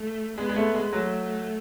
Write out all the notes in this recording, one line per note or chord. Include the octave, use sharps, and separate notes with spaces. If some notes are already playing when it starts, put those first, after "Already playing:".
Already playing: A3
G#3 B3
G#3
A3
G#3
F#3 A3